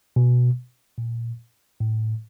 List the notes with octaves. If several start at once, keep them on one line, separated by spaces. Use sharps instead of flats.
B2
A#2
A2